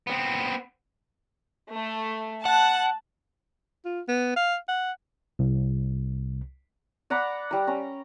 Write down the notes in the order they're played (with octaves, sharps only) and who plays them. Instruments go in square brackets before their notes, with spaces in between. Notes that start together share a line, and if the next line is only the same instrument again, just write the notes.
[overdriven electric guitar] B3 C4
[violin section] A3
[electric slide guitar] F#5 [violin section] A5 F#6
[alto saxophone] F4
B3
F5
F#5
[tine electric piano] C2
[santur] D5 F#5 A#5 B5
G3 A#5
C#4 A#5